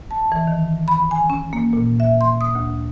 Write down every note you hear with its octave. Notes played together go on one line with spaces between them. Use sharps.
A5
E3
D#3
B5
G#5
C#4
A#3
A#2
E5
C6
D#6
D2